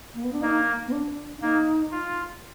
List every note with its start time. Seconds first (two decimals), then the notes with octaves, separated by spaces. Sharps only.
0.14 A#3
0.24 B3
0.33 D4
0.42 A#3 D#4
0.87 B3
0.92 D4
1.38 D4
1.41 A#3 D#4
1.91 F4